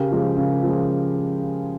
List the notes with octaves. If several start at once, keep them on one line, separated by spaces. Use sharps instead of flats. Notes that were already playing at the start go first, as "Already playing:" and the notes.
Already playing: C#3 G4 A#4
F3 G#3
C#3
F3 G#3